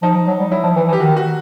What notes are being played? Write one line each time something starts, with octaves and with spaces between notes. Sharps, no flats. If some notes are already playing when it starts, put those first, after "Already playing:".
F3 D#4
F3
F#3
G3
F#3 E4
F3
E3
E3
G4
D#3 F#4
F#4